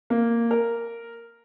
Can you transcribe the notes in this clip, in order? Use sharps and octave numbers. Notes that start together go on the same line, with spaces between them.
A#3
A#4